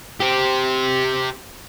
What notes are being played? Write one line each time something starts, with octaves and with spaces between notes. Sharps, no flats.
G4 C5